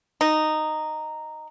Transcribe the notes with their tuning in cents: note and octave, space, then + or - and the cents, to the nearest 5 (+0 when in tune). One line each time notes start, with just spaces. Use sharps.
D#4 -10